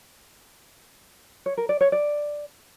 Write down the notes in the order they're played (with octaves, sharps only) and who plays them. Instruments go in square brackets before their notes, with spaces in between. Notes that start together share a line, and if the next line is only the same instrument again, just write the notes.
[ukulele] C#5
A#4
D5
C#5
D5